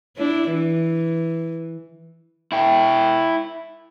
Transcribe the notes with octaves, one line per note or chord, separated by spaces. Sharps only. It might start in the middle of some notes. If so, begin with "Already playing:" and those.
D4 E4
E3
E4 G5